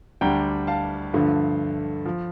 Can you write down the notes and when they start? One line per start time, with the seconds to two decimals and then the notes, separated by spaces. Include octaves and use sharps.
0.21 D2 D3 G3 D4 G5 A#5
0.67 F5 A5
1.13 G2 D3 F3 A3
2.06 F3